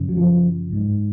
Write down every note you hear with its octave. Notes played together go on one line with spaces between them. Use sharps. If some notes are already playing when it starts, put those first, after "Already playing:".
Already playing: F#2 C#3
F#3
F3
G#2